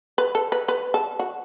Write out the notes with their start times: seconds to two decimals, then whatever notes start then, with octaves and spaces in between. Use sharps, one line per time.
0.18 B4
0.35 A4
0.52 B4
0.68 B4
0.94 A4
1.19 F#4